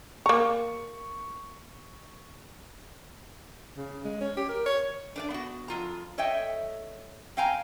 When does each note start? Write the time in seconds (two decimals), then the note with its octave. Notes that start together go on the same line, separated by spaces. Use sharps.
0.26 A#3 A#5 C#6
3.77 C#3
4.05 G#3
4.21 C#4
4.37 G4
4.49 A#4
4.66 C#5
5.16 D4 B4 D5
5.30 B3 F#4
5.68 F2 F4 A#5
6.18 A4 C#5 D#5 E5 G5
7.37 C4 F5 G5 G#5 A#5